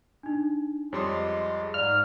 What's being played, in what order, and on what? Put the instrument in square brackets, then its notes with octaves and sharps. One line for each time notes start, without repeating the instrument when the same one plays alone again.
[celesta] D4 D#4
[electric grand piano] F2 G3 C6 [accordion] G#3 [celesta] C#5 D6 D#6
[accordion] G#2 [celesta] D5 F5 [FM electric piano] F6